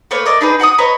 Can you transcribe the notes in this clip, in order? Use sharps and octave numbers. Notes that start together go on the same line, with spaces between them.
A3 A#3 B4 C#5
A#4 D5 D#5
D4 D#4 G#4 B4
F#4 F#5 A5 D#6
B4 C#5 D#5 A#5